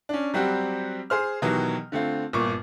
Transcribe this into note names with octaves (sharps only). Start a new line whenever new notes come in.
C#4 D4
F#3 G3 C4 F#4 G4
G#4 C5 F6
B2 D#3 E3 F#3 G4
D3 A3 C4 F4
G1 A#2 C#6 D6